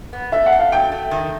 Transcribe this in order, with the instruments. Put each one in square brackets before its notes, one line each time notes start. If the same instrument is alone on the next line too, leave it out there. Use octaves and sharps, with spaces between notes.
[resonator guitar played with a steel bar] B3
[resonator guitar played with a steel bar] A3 [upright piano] E5
[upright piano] F#5
[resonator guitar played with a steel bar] A3
[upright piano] F5
[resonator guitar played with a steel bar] F#3 [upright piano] G5
[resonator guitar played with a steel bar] A3
D#3